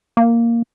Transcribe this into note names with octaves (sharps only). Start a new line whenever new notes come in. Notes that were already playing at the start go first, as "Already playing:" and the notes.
A#3